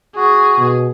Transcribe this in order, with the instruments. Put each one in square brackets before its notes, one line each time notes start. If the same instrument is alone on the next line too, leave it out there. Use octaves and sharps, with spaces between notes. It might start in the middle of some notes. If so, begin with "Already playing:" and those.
[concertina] F#4 [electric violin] G#4
[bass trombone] B2